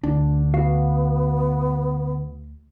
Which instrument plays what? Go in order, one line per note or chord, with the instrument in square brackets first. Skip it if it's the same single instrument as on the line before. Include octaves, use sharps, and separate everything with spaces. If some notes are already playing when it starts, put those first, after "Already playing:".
[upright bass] D2 [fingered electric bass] D3 [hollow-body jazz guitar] D4
[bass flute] B3 [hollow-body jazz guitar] F#4 F5